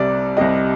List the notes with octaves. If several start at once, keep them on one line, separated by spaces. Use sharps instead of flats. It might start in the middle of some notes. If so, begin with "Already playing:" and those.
Already playing: C2 C3 G3 D5
C2 C3 G3 D#5